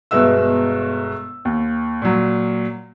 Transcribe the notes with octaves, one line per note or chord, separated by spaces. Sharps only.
G1 B2 G#3 B4 E5 E6
D#2
A#2 F#3